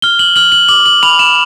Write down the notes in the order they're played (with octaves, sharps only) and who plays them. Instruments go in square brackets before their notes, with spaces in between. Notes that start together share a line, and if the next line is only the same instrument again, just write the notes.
[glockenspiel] F6 G7
F#7
F6 F#7
F#7
D6 F#7
F#7
B5 F7
E7